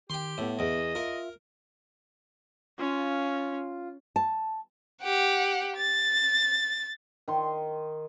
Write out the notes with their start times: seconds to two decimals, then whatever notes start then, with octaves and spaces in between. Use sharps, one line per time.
0.10 D#3 G4 G5 C6
0.38 A2 B3 E5
0.59 E2 D#5
0.95 F4 A#4 E5
2.79 C#4 F4
4.16 A5
5.03 G4 F#5
5.76 A6
7.28 D#3 C6